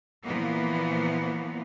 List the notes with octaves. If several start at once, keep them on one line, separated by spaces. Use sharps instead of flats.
A#2 E3 F3 A#3 B3